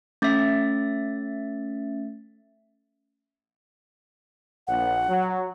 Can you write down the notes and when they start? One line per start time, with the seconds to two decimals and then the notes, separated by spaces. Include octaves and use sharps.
0.22 A3 C#4 E5 A6
4.67 A#1 F#5
5.08 F#3